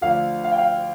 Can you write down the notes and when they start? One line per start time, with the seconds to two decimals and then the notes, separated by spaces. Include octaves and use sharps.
0.01 D2 D3 F3 F5
0.44 F5
0.52 G5
0.58 F5